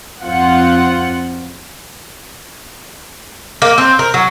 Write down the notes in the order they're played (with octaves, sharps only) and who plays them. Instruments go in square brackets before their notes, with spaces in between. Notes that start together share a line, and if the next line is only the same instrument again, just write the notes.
[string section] F2 C4 F4 F#5
[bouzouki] A#3
C4
A#4
F#3